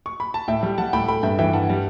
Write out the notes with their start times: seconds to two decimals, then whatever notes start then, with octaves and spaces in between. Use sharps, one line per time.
0.06 C#6
0.20 B5
0.34 A5
0.48 A2 E5 G5
0.63 G3
0.78 G3 F#5 A5
0.93 A2 G5 B5
1.08 A3 G5 B5
1.23 G2 E5 G5
1.39 E3 E5 G5
1.53 G2 F#5 A5
1.69 G3